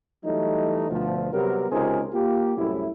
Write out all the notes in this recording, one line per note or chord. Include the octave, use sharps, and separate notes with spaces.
E3 F#3 G3 A3 D#4
D2 B2 F3
C3 F#3 G3 B3 A#4
C#2 C3 D#4 G#4 A#4 C5
A#3 F4 G4
C2 F#2 A2 E4